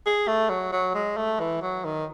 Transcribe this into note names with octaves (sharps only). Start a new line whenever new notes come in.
G#4
A3
F#3
F#3
G#3
A3
E3
F#3
D#3